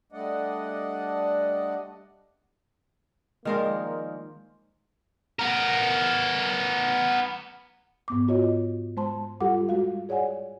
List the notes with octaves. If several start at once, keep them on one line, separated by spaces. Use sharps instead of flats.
G3 A3 D4 D5 D#5 F#5
D#3 F3 G#3 A#3 A#4 C5 D5
B3 A#4
G#2 B3 D6
F4 F#4 C#5 D#5
G#3 C5 A5 C6
G3 F4 G4 A4 F#5 D6
G#3 F#4 F5
G#4 C#5 D5 F#5 G#5